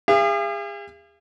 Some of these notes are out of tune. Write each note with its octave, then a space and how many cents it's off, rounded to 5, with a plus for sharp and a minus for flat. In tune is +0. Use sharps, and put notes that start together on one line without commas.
G#4 -40 F5 -45